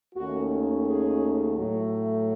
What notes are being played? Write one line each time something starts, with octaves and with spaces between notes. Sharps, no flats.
D#2 D#3 A3 C#4 F#4
G#4
A2 F#3 A3